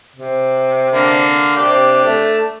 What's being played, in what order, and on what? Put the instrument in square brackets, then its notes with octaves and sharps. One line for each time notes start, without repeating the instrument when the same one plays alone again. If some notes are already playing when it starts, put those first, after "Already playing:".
[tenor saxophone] C3
[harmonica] D3 A#3
[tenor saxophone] C3 [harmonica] D4 G4
[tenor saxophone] A3